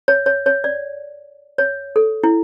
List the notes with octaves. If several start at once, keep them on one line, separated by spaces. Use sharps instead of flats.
C#5
C#5
C#5
D5
C#5
A4
E4